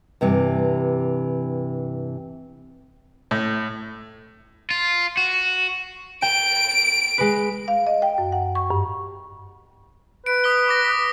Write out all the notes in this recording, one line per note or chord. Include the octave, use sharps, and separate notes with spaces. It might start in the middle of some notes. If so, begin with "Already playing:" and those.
G2 C3 E3
A2
F4
F#4
G5 D7
G#3 B4
F5
D#5
G5
F#2
F#5
C#6
G2
B4 D7
D#6 B6 G7
D6 A#6
D#6 B6